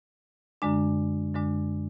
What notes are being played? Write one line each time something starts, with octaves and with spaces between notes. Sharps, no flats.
F#2 D3 G#3 D4
F#2 D3 G#3 D4